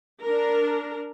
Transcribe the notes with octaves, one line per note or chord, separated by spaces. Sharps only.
D4 A#4